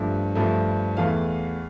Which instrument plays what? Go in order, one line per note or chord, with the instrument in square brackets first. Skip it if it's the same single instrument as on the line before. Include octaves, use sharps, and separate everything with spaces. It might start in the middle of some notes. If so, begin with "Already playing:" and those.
Already playing: [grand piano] G2 F3 A3
G2 F3 A3
E2 E3 A3 F5